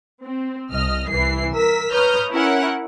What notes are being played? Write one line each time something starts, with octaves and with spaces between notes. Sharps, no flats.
C4
C2 D#5 F6
C2 E3 C7
A#4 E6 B6
B4 C#5 A#5 D#6 F6 G6
C#4 E4 A#4 F#5